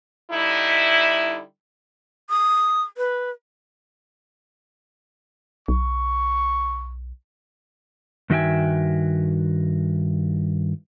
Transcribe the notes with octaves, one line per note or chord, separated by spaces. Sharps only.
D3 G3 D#4 E4
D#6
B4
B1 C#6
G2 D#3 F#4 E5 G5 G#5